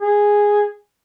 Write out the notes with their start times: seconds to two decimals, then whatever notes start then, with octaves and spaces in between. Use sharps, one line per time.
0.01 G#4